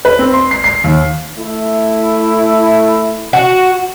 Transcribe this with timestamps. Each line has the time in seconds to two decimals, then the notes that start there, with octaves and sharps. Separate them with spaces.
0.05 B4
0.19 C4
0.34 C6
0.51 C7
0.64 C7
0.84 D#2
1.37 A3 E4
3.33 F#4